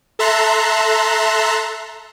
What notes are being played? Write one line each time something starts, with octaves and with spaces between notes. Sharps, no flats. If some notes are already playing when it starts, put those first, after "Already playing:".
A4 E5 A5 A#5 C6 F#6